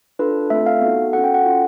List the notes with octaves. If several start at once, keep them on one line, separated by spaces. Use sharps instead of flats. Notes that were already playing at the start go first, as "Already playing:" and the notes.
D4 F4 A4 B4
A3 C4 F4 A4 E5
F5
B3 D#4 F#4 A4
C#4 F#4 A4 F#5
G5
F#5
C#4 F4 A4